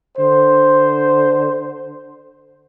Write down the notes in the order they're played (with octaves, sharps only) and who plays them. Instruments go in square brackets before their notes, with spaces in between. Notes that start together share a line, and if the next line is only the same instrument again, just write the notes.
[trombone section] D3 C5